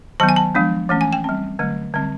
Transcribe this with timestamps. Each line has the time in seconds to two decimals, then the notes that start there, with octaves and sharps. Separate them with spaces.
0.20 D#3 F#3 B3 A5
0.29 G#5
0.36 A5
0.55 F3 G#3 B3 D4
0.89 E3 A3 C#4
1.01 G#5
1.13 G5
1.24 G3 C4
1.59 D3 F#3 A3
1.94 D3 G3 C4